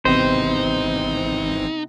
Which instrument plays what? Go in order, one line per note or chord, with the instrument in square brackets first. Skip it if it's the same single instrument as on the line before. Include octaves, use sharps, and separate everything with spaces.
[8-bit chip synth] G#1 E3 C4 [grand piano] C3 B3 [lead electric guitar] D#4 [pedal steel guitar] C5